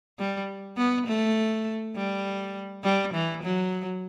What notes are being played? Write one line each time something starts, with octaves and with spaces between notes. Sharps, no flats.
G3
B3
A3
G3
G3
E3
F#3